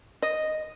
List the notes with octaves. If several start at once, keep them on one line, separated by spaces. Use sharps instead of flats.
D#5